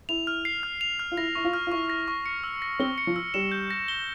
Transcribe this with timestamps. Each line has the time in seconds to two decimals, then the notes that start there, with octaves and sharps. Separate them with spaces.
0.09 E4 F7
0.27 F6
0.45 C7
0.63 F6
0.81 F7
0.99 F6
1.12 F4
1.17 E4 A#6
1.35 E4 C#6
1.44 F4
1.54 F6
1.67 F4
1.72 E4 C#6
1.89 A#6
2.08 C#6
2.26 C#7
2.44 E6
2.62 A#6
2.79 C4 G7
2.98 C#7
3.07 F3
3.16 E6
3.34 G3 E7
3.52 G6
3.71 A#6
3.88 G7